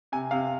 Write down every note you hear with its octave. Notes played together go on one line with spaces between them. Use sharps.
C3 G#5
C3 F5